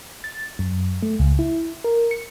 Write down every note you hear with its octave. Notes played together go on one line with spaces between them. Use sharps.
A6
F#2
A3
C#2
E4
A#4
C#7